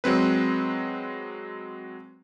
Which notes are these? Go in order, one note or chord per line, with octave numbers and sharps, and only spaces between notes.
F#3 G#3 C4 B4